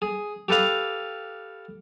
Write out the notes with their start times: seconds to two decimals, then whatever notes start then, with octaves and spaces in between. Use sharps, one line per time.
0.02 G#4
0.48 G4 A4 B4 F5